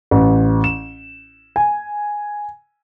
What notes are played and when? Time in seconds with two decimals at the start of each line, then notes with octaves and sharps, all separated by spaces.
0.11 A1
0.64 E7
1.56 G#5